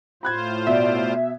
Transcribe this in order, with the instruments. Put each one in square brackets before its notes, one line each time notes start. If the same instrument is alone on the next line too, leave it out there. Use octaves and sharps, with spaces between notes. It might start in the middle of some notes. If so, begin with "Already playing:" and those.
[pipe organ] A2 F4 C5 [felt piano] B5 F#6 G#6
[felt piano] B2 [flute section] D5 [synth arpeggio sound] E5